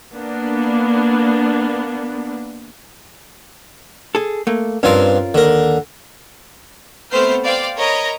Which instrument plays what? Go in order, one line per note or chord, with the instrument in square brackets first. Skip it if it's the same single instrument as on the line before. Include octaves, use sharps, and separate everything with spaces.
[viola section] A#3 B3 D4
[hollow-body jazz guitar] G#4 A4
A3 A#3
[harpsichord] G2 C4 F5 [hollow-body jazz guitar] C#4 F4 A#4
[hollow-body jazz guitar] D#2 [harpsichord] D3 A#4
[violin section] A3 B3 C4 C5 F6 G6
C5 D5 F5 G5 D6
A#4 C#5 D#5 A#5 B5